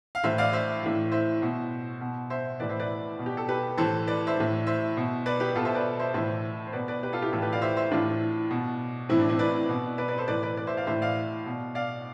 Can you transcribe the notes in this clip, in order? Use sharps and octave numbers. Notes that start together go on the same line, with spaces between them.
F5
A2 E3 C5 E5
D5 F5
C5 E5
A2 E3
C5 E5
B2
B2
C5 E5
A2 E3 B4 D5
C5 E5
B4 D5
B2
G4
A4
G4 B4
A2 E3 A4 C5
B4 D5
C5 E5
A2 E3
C5 E5
B2
B4 D5
G4 B4
B2 F4 A4
C5 E5
B4 D5
C5 E5
A2 E3 C5 E5
C5
B2 B4 D5
B4 D5
G4 B4
F4 A4
E4 G4
A2 E3 F4 A4
G4 B4
D5 F5
C5 E5
C5 E5
A2 E3 D4 F4
B2
A2 E3 C4 E4
D4
C4 E4
B4 D5
B2
B4 D5
B4 D5
A4 C5
A2 E3 B4 D5
B4 D5
B4 D5
C5 E5
D5 F5
A2 E3 C5 E5
D5 F5
B2
D5 F5